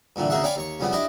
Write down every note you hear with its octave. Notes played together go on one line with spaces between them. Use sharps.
G2 A#2 D3 E3
D2 C#3 A#3 G#4 E5 F#5
C#5 D5 F5 G5 G#5 B5
D#2 C#5 C#6
C2 F2 C#3 G3 B3
D4 E4 G4 D5 D#5